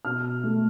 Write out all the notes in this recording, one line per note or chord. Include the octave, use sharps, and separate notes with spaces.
B2 F6
A3